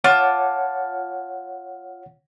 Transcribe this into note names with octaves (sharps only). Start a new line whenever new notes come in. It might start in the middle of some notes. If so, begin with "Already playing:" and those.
F4 C#5 F#5 A5 D6